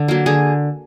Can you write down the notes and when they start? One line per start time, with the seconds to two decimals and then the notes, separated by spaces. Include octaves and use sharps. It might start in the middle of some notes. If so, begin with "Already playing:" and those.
Already playing: D3
0.08 F#3 A#3
0.26 D3 G#4